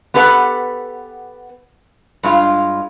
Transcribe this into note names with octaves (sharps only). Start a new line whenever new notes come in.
B3 G4 A4 B4 F#5
G2 G#3 F4